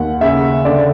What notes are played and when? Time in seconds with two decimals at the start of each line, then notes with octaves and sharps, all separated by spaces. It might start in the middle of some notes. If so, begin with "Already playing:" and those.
Already playing: D#2 F#5
0.21 C#3 E5
0.65 D3 D5